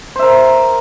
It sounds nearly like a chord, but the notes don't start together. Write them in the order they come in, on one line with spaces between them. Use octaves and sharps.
C5 E5 A#4